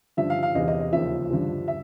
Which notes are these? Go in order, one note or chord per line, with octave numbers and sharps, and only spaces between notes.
G2 D3 F3 E5
F5
F5
E2 C3 E3 D#5
D#5
D#5
D#2 C#3 F3 E5
G2 D3 F3
E5